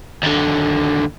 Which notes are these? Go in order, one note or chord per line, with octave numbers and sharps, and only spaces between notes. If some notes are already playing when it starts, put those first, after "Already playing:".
D#2 D3